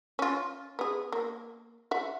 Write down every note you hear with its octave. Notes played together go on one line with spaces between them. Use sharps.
C#4 F4
B3 G#4
A#3
E5 F#5